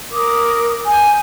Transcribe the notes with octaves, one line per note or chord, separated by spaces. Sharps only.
A#4 D6 D#6
G#5 G6